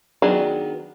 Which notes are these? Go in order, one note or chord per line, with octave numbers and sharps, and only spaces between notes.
D#3 F#3 B3 D4 G#4